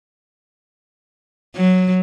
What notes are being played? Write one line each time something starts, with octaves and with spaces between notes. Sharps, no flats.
F#3